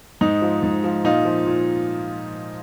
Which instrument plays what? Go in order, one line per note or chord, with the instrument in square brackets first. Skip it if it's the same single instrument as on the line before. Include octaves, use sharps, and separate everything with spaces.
[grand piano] G#2 D#4
F3
G#2
F3
A#2 D#4 F4
F3
A#2